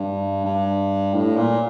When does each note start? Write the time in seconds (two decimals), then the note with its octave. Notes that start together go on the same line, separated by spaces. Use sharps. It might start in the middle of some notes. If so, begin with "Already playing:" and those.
Already playing: G2
0.45 G2
1.14 A2
1.37 A#2